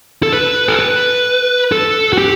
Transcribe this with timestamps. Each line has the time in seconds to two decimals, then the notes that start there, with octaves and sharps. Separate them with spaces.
0.23 A4
0.33 B4
0.68 A4
0.79 B4
1.72 A4
2.13 F#4
2.18 G4